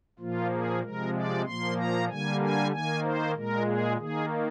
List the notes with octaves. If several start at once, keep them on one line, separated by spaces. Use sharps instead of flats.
A#2 F3 A#3 F4
G#4
C3 F3 G#3 A#4
D5
A#2 F3 A#3 C6
A#5
D3 G3 A#3 G#5
G#5
D#3 A#3 G#5
C5
A#2 G#3 A#4
G#4
D#3 A#3 G#4